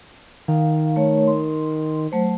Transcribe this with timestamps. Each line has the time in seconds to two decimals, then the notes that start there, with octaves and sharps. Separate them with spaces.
0.48 D#3 F5
0.96 A3 C#5
1.27 C6
2.12 F#3 A3 C5